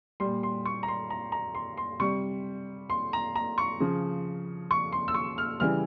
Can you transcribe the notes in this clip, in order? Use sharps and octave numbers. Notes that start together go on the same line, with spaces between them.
A#2 G3 C6
C6
C#6
A#5
C6
A#5
A#5
C6
C6
C3 G3 C#6
C6
A#5
A#5
C#6
C#3 F3
C#6
C6
E6
C#6
F6
C#3 E3 G3 F6